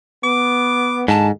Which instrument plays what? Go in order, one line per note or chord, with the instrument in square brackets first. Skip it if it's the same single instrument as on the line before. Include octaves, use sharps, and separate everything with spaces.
[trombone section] B3 [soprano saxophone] D6
[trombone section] D#2 D3 G#3 [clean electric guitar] G#2 [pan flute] A5